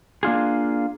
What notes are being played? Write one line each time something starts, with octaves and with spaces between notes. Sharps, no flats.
A#3 D4 F4 G#4